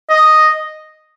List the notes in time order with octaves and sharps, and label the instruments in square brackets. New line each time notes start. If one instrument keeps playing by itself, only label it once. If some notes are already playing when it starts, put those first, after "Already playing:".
[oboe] D#5